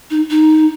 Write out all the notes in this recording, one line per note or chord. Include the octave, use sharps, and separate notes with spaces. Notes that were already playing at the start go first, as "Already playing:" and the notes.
D#4
D#4